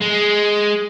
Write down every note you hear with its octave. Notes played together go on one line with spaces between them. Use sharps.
G#3